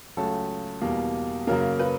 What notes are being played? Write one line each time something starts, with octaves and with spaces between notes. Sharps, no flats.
C#2 C#3 F#3 A3 A4
E2 B2 G3 A#3
F#2 C#3 F#3 A#3 A#4
B4